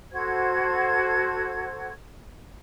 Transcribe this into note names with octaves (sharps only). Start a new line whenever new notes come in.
F#4 A4 C5 G#6